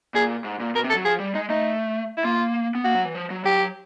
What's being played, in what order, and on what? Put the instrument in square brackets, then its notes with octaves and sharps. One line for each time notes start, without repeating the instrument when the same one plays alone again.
[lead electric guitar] A#2 [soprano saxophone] G#4
[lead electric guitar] G#2
A#2
[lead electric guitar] B2 [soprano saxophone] A#4
[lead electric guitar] C3
[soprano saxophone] A4
[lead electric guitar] F#3
[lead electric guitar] F3 [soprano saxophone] G#4
[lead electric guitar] G3
[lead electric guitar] G#3 [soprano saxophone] D#4
[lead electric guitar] A3 [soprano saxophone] D#4
[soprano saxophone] E4
[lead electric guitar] A#3 [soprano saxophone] F4
[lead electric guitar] B3
[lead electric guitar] A#3 [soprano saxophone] F#4
[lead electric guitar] F#3
E3
F3
F#3
[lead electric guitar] F#3 [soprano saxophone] G4